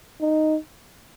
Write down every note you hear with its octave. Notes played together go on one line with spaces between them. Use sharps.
D#4